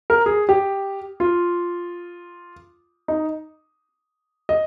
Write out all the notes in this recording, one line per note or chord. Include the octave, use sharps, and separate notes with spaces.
A#4
G#4
G4
F4
D#4
D#5